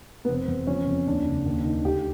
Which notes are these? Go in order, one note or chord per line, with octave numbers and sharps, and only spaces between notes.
B3
F1 C4
E2
F3 C#4
F2
D#2 D4
C#3
D#2
D#3
D2 G4